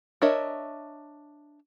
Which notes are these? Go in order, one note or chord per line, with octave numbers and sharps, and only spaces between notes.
D4 A#4 C#5 D#5 E5